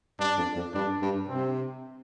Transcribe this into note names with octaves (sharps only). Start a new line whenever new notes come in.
G2 D4
F2
F2
G2 D4
G2
C3 C4